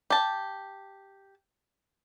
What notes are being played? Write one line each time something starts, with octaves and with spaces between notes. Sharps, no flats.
G4 A5